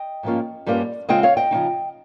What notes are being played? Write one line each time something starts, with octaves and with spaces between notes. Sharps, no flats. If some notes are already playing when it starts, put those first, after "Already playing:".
Already playing: D#5 G5
G#2 F3 A#3 C#4 F4
G2 G3 A#3 C#4 F4
C#3 G#3 C4 F4 D#5 G5
C#5 F5
D#5 G5
C#3 F3 C4 D#4